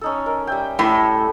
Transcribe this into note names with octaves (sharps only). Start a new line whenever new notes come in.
C#4 D#4 A4
A#4
G3 E5 G5
A2 A5